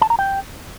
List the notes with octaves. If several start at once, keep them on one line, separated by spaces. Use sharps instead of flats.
A5
A#5
G5